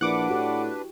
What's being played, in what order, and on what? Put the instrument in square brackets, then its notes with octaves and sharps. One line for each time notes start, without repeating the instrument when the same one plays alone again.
[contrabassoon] A#1 [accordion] D4 B4 [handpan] E4 [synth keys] F#5 D6
[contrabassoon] A2 [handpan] F#4 G4